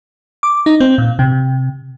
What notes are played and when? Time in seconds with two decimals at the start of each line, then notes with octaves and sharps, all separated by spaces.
0.43 D6
0.66 D#4
0.80 C4
0.98 A#2
1.19 C3